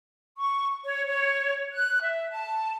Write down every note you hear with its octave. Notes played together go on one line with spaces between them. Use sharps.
C#6
C#5
C#5
F#6
E5
A5